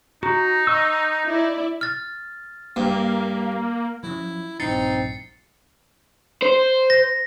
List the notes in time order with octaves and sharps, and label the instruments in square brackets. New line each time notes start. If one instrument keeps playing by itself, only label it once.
[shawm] D#4 [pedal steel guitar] F#4 [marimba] A#5
[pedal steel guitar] D#5 C#6 E6
[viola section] E4 D5
[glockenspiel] F6 A6
[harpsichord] G2 [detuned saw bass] A#3
[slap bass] F3 F#3 C#4 [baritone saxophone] E4
[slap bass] A#1 G2 E3 [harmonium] C4 [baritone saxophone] D#4 [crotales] A6 C7 C#7
[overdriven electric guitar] C5
[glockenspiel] A#6